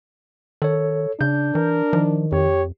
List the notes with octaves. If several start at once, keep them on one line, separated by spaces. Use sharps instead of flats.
D#3 A4 C#5
C#3 D4 G6
E3 A#4
D#3 F3
F2 G4 C#5